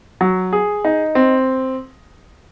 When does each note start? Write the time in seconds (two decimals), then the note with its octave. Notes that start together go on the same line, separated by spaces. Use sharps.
0.21 F#3
0.53 G#4
0.85 D#4
1.15 C4